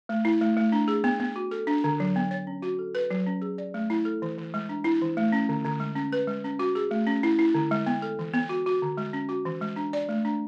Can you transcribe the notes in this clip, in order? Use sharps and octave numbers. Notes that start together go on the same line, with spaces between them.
A3
E4
A3
A3
D4
G#4
B3
B3
F#4
A4
D4
D3
F#3
B3
C#5
C#4
F#4
A4
B4
F#3
C#4
G#4
D5
A3
E4
A4
E3
E3
G#3
D4
E4
E3
A3
C#4
D3
D3
G#3
C#4
B4
G#3
C#4
F#4
G#4
A3
C#4
E4
E4
D3
G#3
B3
A4
E3
B3
F#4
F#4
D3
G#3
C#4
F#4
E3
G#3
D4
D5
A3
D4